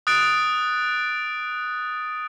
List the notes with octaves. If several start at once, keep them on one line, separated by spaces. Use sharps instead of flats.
D#6 F#6 A6 D7